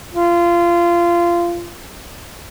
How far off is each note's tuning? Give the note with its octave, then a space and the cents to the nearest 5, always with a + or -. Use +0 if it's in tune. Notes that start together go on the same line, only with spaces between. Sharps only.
F4 -20